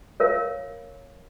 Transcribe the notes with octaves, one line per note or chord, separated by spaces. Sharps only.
A#4 C#5 F5